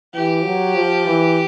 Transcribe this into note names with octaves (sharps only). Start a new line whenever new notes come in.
E3 G4
F#3
F3
E3